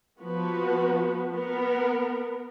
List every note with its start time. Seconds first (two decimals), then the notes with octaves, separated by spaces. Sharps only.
0.21 F3 B3 F#4 B4
1.31 B3 A#4